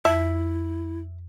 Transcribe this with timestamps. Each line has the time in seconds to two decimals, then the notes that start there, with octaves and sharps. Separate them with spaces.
0.05 F2 E4 E5